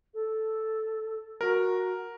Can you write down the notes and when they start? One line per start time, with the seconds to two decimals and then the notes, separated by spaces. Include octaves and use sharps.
0.14 A4
1.41 F#4 A#4